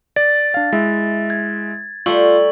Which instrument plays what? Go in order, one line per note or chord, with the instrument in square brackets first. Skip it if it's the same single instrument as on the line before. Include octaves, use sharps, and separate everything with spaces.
[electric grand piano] D5 [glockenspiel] A6
[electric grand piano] D4 F5
G#3 E4 E5
[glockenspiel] G#6
[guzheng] G3 A3 [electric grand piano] F4 [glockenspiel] C#6 E6 F#7